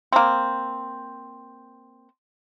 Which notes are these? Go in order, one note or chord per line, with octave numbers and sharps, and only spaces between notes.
A#3 C4